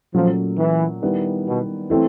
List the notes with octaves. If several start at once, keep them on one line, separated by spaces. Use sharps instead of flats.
A#2 F3 F#3 A3 C#4
E3
D#3 G3 B3 E4
B2
E3 A3 C4